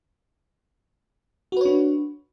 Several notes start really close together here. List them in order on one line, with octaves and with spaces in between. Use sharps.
F#4 B4 C#5 D4